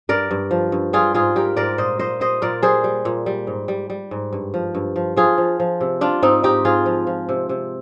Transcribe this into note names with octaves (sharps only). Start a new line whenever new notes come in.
G2 A#4 D5
G2
F3
G2
G3 F4 G#4
G#2 F4 G#4
G3 G4 A#4
G#2 A#4 D5
A#2 C5 D#5
A#2 C5 D#5
G3 C5 D#5
A#2 A#4 D5
G3 G#4 C5
G3
A#2
G3
G#2
G3
G3
G#2
G2
F3
G2
F3
F3 F4 G#4
F3
F3
C3
G3 D4 F4
G#2 C4 D#4
G#2 D#4 G4
G#2 F4 G#4
F3
F3
C3
C3